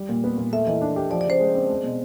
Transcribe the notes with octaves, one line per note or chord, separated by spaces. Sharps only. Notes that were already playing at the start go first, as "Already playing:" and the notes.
Already playing: G3
A#2
B3
A#2
A3 E5
E3 D#5
D4
G4
F3 D5
D5
C#3 C5
G#3
C4
G#3
B2